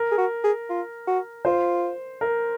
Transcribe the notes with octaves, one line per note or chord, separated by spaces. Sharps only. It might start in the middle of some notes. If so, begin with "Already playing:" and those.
Already playing: A#4
G#4
F#4
G#4
F4
F#4
F4 C5
A#4